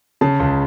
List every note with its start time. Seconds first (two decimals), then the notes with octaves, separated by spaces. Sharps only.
0.21 C#3 A5
0.40 C#2